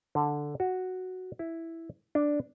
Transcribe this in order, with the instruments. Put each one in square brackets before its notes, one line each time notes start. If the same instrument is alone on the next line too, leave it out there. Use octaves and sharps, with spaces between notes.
[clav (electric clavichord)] D3
F#4
E4
D4